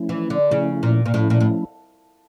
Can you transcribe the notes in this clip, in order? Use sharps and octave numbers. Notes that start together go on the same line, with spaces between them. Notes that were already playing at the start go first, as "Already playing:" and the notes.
Already playing: F3 A3 C#4 E4
E3
D3
C#3 F3 A3 C#4 E4
A#2
A#2
A2 F3 A3 C#4 E4
A#2
A2